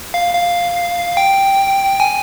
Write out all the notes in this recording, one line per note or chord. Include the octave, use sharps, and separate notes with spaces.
F5
F5
G5
G#5